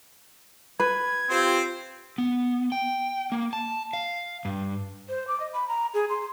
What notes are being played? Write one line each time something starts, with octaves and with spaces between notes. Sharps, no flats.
B4 G#6
C4 F4 G4 C5
B3
G5
A#3
A5
F5
G2
C5
D6
D#5
B5
A#5
G#4
C6